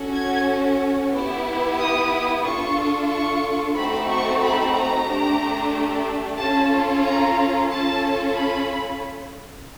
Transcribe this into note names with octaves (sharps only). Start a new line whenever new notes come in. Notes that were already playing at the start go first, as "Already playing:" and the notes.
Already playing: C#4 F#4 A4
G#6
B3 E4 G4
D#6
D4 F4 A4 C#6
C#6
A3 C4 D#4 F#4 A4 B5
C#6
B5
A#5
A3 D4 G4
C#4 F4 A4 A5
A#5
C#4 F4 A4 A5
B5